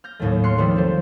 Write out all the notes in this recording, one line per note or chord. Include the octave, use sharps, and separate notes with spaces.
F6 G6 A#6
D#2 A2 F#3 A3
C6 F6 F#6 C7 C#7
D#3 F3 G3 E4 B4
C4 F4 A4 C5